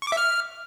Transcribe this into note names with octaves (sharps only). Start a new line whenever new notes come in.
C#6
D6
E5
F6